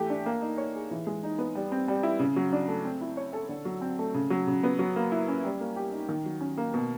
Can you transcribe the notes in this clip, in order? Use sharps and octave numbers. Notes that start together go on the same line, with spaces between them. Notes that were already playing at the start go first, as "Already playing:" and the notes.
Already playing: E3 A3 G4
D4
A#3
D#4
C#5
G#4
E3
G#3
D#4
B3
G3
C4
G3
E4
C#3
F#3
D4
A3
C4
E4
C#5
A4
D3
F#3
C4
A3
C#3
F#3
C#3
B3
F#3
A#3
E4
C#4
G3
A#3
G4
D#4
D#3
F#3
C#4
A#3
B2